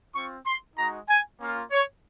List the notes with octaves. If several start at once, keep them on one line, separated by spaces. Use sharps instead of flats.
C4 F4 C#6
C6
G#3 D#4 F#4 A#5
G#5
A#3 C#4 F4
C#5